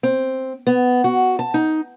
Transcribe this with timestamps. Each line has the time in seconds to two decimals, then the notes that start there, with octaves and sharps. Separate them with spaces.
0.03 C4
0.67 B3
1.04 F#4
1.39 A5
1.54 D#4